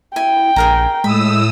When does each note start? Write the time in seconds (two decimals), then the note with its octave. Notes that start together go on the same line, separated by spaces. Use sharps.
0.16 E4 G5 G#5
0.56 A#1 G#4 A#4 A#5
1.04 A2 G#3 B5 D#6 E6